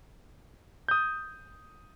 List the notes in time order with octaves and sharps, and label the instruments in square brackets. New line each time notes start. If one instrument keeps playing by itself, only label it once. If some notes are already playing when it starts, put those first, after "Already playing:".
[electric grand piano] D#6 G6